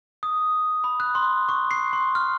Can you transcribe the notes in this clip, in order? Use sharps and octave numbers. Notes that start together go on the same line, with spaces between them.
D#6
B5
F#6
C6
C#6
C7
C6
F6